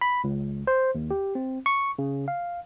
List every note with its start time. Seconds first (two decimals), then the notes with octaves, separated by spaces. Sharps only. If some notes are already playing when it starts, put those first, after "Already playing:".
0.01 B5
0.24 C#2
0.67 C5
0.95 D#2
1.11 G4
1.35 C4
1.66 C#6
1.99 C#3
2.28 F5